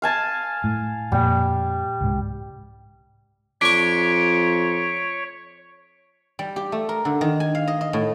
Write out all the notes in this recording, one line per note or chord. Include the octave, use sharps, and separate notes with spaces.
F5 G#5 A5
A2
F2 A#2 G3 A#3
C2 G#2
F2 D4 C#5 C#6 B6 D7
G3
G4
A3
A#4
D3
D#3
G#5
F5
D#5
D#5
A2